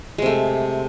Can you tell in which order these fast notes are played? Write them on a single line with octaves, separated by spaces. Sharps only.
G#3 C3 A3